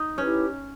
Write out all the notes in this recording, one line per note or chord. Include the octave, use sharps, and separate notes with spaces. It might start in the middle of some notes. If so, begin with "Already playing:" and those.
Already playing: D#4
C#4 E4 G4 B4